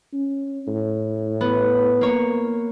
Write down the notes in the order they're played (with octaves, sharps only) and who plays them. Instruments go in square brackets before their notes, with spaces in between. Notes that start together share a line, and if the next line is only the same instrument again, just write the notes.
[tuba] C#4
A2
[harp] B3
A#3 C#5